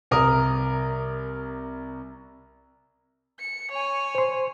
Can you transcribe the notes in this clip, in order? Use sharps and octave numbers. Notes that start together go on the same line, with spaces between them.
C2 A#4 D#6
C#7
C#5 G#5
C5 C6